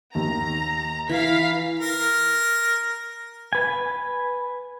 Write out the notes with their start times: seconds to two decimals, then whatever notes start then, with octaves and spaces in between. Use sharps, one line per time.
0.15 D#2 A#5
1.09 E3 F5 B6
1.79 A#4
3.53 B4 G#5